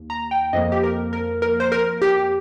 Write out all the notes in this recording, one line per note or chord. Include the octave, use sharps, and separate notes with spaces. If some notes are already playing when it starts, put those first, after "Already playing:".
Already playing: D#2
A#5
G5
F2 F3 A#3 D#5
G4
A#4
A#4
A#4
C5
A#4
G4